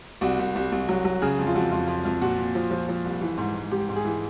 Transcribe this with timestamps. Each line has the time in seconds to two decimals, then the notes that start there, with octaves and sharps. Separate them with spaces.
0.21 C2 F#4
0.39 C2
0.55 C2
0.72 C2
0.88 F#3
1.05 F#3
1.22 C#3 G#4
1.39 F2
1.47 F4
1.55 F2 F#4
1.71 F2 F4
1.88 F2
2.05 F2
2.21 A#2 F#4
2.39 A#2
2.55 F3
2.71 F3
2.89 F3
3.05 C2
3.21 E3
3.38 G#2
3.54 G#2
3.71 G#2 G4
3.89 G#2
3.96 G#4
4.05 E3